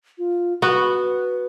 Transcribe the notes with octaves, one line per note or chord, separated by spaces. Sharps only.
F4
B3 F#4 B4